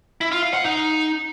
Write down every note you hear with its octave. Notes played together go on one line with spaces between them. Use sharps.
E4
F4
F5
F#5
D#4